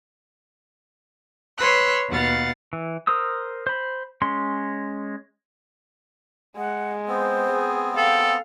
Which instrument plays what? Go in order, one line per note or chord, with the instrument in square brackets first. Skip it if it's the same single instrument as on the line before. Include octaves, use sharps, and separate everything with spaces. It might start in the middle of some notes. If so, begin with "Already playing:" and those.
[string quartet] B4 C#5 C6 E6 F#6
D#2 B2 F5 F#5 A6
[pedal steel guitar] E3
A#4 C5 D#6 E6
C5 B5
G#3 C#4 C6
[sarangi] G#3 [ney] F#5
[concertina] B3 C4 [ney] C5
[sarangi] G#4
[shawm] A4 [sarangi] F5 [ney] G5